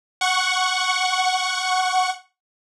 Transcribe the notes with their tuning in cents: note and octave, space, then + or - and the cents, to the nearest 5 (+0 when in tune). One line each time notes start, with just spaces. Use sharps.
F#5 +0 C#6 +0